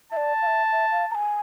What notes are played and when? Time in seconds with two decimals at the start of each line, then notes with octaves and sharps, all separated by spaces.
0.12 D5 E5 A5
0.42 F5
0.47 E5
0.72 E5
0.91 F5
1.11 A#5
1.15 G#5